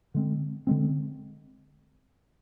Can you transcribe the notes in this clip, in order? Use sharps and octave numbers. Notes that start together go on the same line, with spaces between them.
D3 G#3 C4
D3 G#3 C4